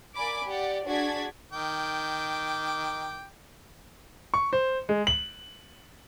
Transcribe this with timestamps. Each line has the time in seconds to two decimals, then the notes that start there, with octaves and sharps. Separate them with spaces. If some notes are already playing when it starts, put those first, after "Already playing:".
0.15 A#3 D5 G#5 B5 D6
0.45 G4 D5 F#5
0.86 D4 F#4 G#4 D5 G#6 B6
1.52 D#3 G5 D6
4.34 C#6
4.53 C5
4.89 G#3
5.07 F#7